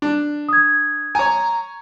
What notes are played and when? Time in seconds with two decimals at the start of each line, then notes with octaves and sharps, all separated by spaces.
0.02 D4
0.49 D#6 G#6
1.15 C#5 G#5 A#5